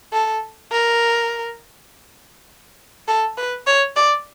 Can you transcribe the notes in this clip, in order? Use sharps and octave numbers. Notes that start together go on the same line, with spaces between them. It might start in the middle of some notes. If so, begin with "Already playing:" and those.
A4
A#4
A4
B4
C#5
D5